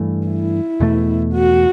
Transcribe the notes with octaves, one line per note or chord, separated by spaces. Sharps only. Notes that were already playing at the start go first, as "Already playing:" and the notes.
Already playing: G2 E3 A3
E4
E2 B2 A3
F#4